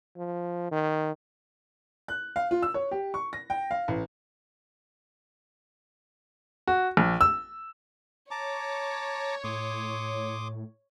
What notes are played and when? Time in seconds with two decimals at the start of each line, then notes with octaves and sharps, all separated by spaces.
0.16 F3
0.72 D#3
2.08 F#6
2.36 F5
2.51 F4
2.63 E6
2.74 C#5
2.91 G4
3.14 C#6
3.33 A#6
3.50 G5
3.71 F5
3.88 A1
6.67 F#4
6.97 A#1
7.21 E6
8.31 C#5 A5 A#5 D6
9.44 A2 C6 D6 D#6